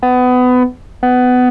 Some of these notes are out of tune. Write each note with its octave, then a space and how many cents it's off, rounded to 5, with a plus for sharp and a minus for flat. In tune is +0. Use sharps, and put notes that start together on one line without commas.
B3 +25
B3 +20